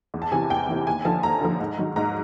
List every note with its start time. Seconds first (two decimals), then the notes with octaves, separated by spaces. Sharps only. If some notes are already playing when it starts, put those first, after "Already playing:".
0.14 E2
0.22 A5
0.32 C3 E3 G#5
0.50 E2 G5
0.69 C3 E3
0.87 D#2 G#5
1.05 D3 F3 A5
1.23 D#2 A#5
1.41 D3 F3
1.60 G#2
1.78 D#3 F#3
1.96 G#2 A#5